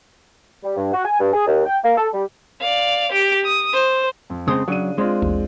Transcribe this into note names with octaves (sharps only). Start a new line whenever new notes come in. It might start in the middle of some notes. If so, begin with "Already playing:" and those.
G3
G2
F#4
G#5
G2
G#4
D#2
G5
A#3
A4
G3
D5 F5
G4 D7
D#6
C5
F2
C#3 G#3 C4 A5 D#6
C#3 F#3 D4 D#7
G#3 C4 D4 F4
A1 D#2